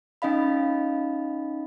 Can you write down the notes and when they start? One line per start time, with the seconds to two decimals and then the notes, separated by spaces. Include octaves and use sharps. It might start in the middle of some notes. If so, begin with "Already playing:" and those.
0.22 C#4 D#4 D#5 F5 B5